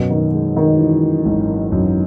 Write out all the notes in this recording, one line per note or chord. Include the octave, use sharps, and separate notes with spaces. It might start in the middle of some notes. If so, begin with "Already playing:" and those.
Already playing: F#2 B2
D#3
G#3
D#3
E3
G#1
F#2